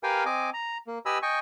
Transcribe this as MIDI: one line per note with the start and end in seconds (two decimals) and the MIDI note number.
0.03 0.24 67
0.03 0.24 70
0.03 0.24 71
0.03 0.24 77
0.03 0.24 79
0.03 0.24 80
0.25 0.50 60
0.25 0.50 75
0.25 0.50 80
0.25 0.50 86
0.54 0.78 82
0.87 0.99 58
1.06 1.18 67
1.06 1.18 71
1.06 1.18 75
1.06 1.18 80
1.06 1.18 83
1.06 1.18 88
1.22 1.39 75
1.22 1.39 79
1.22 1.39 80
1.22 1.39 85